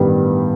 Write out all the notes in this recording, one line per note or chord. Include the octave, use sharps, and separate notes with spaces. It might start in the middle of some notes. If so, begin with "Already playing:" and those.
Already playing: A1 G2 D#3 G3 B3